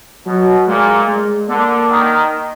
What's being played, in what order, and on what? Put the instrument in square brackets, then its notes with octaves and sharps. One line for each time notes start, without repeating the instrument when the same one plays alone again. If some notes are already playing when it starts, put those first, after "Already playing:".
[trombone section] B2 [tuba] F#3
[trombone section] A#2 [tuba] G#3
[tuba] G#3
[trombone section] D3 [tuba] A#3
[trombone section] D#3